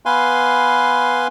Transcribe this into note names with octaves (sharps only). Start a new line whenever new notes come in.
B3 B4 F5 G#5 C6